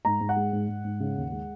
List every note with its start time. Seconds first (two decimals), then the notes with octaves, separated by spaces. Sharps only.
0.05 G#2 A#5
0.21 G#2
0.29 F#5
0.36 G#3
0.53 G#2
0.69 G#2
0.84 G#2
1.00 C#3
1.17 D#2
1.32 G#3